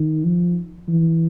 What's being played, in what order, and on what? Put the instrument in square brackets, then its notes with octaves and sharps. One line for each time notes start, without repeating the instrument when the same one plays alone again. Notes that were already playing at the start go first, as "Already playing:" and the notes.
Already playing: [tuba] D#3
F3
E3